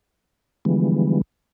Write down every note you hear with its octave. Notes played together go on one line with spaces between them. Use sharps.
D3 E3 F3 G3 G#3 B3